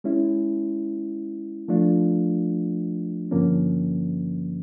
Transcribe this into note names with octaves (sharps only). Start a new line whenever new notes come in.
G#3 C#4 E4
F3 A3 D4 F4
G2 D3 F3 A#3 C#4